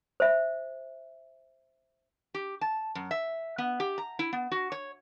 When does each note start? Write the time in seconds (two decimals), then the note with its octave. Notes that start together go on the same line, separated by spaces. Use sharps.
0.20 C5 E5
2.34 G4
2.61 A5
2.95 F#2
3.11 E5
3.58 B3
3.80 G4
3.98 A#5
4.19 E4
4.33 B3
4.52 F#4
4.72 C#5